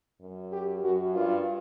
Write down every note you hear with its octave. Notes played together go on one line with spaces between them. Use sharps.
F#2
G4
F#2 F#4
G2 F4